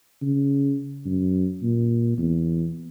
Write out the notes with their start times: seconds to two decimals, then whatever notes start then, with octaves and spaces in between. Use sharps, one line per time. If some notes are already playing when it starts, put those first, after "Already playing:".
0.22 C#3
1.06 F#2
1.63 A#2
2.18 E2